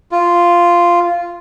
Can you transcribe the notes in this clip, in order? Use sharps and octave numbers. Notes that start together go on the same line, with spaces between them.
F4